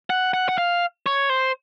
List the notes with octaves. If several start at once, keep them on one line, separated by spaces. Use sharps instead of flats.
F#5
F#5
F#5
F5
C#5
C5